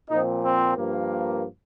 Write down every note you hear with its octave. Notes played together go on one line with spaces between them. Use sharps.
A#2 F3 C4 D#4
C4
G2 F3 A#3